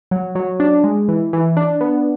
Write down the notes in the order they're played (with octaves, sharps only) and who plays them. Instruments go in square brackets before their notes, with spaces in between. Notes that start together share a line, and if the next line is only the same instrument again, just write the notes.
[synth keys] F#3
F#3
D4
G#3
E3
E3
D4
B3